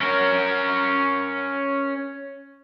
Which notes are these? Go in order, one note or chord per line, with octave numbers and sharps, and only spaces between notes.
C#4 A#4